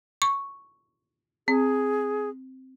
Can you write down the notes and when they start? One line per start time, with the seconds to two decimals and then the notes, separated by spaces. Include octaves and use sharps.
0.22 C#6
1.48 C4 G#4